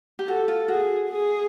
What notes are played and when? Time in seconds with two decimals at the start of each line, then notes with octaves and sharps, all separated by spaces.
0.19 G4
0.27 F#4 A4
0.48 F4
0.68 F#4 G#4
1.09 G#4